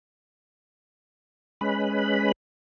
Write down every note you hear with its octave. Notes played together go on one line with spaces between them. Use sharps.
G#3 C#4 B4 B5